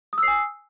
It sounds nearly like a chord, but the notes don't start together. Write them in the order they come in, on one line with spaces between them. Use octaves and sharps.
D#6 E6 C7 G#5